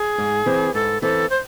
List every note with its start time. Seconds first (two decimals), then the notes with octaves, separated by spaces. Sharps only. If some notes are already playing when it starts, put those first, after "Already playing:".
Already playing: G#4
0.18 G#2
0.46 E3 C4
0.74 G#2 A4
1.02 E3 C4 A4
1.30 C5